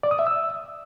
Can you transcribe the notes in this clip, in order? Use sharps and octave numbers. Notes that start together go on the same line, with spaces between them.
D5
D#6
E5
E6